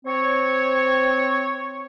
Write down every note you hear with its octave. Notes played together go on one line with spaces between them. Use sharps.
C4 C#5